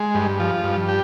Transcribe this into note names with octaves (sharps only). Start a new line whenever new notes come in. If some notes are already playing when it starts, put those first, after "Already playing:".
Already playing: G#3
G2
F3
G2
G4